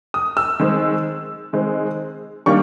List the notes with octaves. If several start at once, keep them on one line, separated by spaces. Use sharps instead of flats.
D#6
E6
D#3 G#3 C4
D#3 G#3 C4
D#3 G3 A#3 D4 C#6